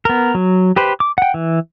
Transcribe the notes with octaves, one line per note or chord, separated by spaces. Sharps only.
B3 A#4
F#3
G4 B4 C5
D6
F#5 G5
E3